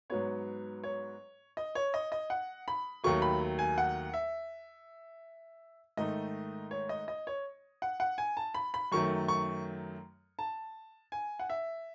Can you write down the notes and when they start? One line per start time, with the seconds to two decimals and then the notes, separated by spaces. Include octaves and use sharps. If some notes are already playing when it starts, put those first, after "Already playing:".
0.10 G#2 F#3 B3 C#5
0.84 C#5
1.57 D#5
1.75 C#5
1.94 D#5
2.12 D#5
2.30 F#5
2.68 B5
3.03 D#2 D#3 F#3 A3 C#6
3.22 B5
3.59 G#5
3.78 F#5
4.14 E5
5.97 G#2 D#3 A3 D#4 D#5
6.71 C#5
6.89 D#5
7.08 D#5
7.27 C#5
7.82 F#5
8.00 F#5
8.18 G#5
8.37 A5
8.54 B5
8.74 B5
8.92 F#2 D#3 F#3 A3 C#6
9.28 C#6
10.39 A5
11.12 G#5
11.39 F#5
11.50 E5